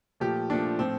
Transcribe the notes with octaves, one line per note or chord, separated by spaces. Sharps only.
A#2 F3 A3 G4
A#2 F3 A3 D4
A2 F3 A3 C4